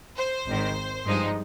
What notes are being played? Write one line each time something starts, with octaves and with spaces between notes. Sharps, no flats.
C5
G#1 G#2 D#3
G2 F3 G#3 D#4